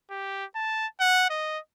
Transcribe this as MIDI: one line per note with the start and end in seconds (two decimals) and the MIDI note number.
0.11 0.45 67
0.56 0.87 81
1.00 1.28 78
1.30 1.59 75